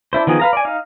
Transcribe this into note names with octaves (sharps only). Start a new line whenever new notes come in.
D4 E4 C5
D#3 F3 B3 G#4
B4 F5 A#5
D5 G#5
D#4 F5